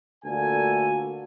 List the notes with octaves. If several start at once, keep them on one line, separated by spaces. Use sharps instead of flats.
D2 A#2 F#4 A4 G#5